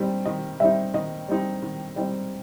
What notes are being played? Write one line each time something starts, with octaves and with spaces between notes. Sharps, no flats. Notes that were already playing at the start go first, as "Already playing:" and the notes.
Already playing: D#3 G3 C4 D#4
D#3 D#5
G3 C4 D#4 E5
D#3 D#5
G3 C4 D#4
D#3
G3 C4 D#4